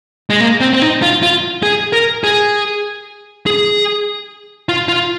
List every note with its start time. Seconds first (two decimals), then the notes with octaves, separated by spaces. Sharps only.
0.30 G#3
0.40 A#3
0.61 C4
0.74 C4
0.82 D#4
1.02 F4
1.22 F4
1.63 G#4
1.93 A#4
2.24 G#4
3.46 G#4
4.69 F4
4.89 F4